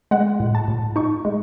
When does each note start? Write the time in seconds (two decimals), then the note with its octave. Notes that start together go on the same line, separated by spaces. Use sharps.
0.11 G#3 F#5
0.40 A2
0.55 A5
0.68 A2
0.96 D#4 C#6
1.25 G#3